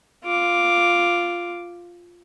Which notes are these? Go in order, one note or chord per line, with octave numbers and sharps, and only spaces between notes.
F4 D6